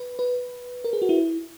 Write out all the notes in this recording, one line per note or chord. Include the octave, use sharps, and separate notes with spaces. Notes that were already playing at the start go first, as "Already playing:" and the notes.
Already playing: B4
B4
A#4
G#4
F#4
E4